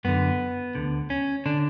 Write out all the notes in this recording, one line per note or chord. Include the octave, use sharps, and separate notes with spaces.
F#2 D3 B3
D2 D3
C#4
D3 D4